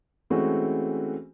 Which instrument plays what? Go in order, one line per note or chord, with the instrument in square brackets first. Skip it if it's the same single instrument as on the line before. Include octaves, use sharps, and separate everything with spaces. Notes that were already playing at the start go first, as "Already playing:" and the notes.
[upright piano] E3 G#3 A3 C4 C#4 F#4